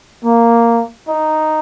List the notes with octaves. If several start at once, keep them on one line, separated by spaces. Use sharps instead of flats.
A#3
D#4